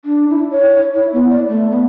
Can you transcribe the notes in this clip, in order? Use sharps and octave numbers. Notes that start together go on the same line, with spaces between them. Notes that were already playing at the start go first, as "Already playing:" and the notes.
D4
E4
C#5
E4
B3
D5
A3
B3